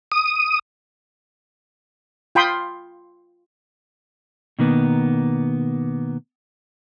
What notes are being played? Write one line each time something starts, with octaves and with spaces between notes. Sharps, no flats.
D#6
F4 G5 B5 C6 D#6
B2 D#3 A#3 B3